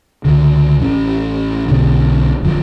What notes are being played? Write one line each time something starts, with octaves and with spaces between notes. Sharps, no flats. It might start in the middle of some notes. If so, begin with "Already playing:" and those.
C#2 D3
A1 E3 C#4
B1 B2 D3
G1 F3